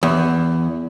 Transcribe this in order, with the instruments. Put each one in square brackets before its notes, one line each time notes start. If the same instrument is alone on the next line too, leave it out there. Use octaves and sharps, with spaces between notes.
[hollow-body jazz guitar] E2